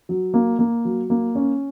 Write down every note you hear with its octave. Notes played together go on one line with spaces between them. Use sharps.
F#3
A#3
A#3
F#3
A#3
C#4